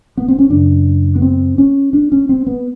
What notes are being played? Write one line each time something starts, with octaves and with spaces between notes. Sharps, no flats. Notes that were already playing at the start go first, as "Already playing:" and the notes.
B3
C4
C#4
F#2 C#3 D4
B3
C4
C#4
D4
C#4
C4
B3